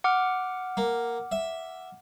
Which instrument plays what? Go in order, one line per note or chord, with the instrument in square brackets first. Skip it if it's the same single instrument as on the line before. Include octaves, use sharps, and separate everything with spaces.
[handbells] F#5 D6 F6
[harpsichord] A#3
E5